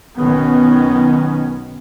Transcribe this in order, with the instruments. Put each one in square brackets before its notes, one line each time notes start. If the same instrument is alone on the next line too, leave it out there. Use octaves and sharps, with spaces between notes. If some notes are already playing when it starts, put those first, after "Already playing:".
[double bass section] B1 D#3 B3 C#4